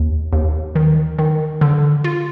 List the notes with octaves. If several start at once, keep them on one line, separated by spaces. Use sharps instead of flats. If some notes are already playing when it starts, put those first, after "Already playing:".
Already playing: D#2
D#2
D#3
D#3
D3
F4